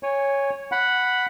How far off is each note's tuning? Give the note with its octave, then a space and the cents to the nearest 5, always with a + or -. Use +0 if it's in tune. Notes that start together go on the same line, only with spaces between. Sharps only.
C#5 +0 G#5 -20
F#5 +0 B5 +0